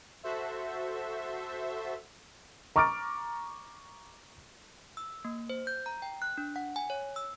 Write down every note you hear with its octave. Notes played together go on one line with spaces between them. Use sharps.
F#4 A4 C5 E5
A#5 C#6 D6 F6 A6 D7
E6
A#3
C5
G6
A#5
G5
F#6
D4
F#5
G#5
C#5
E6